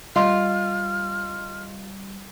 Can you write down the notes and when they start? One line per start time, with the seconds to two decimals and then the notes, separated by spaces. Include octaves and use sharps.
0.16 G3 F4 D#5 C6 F6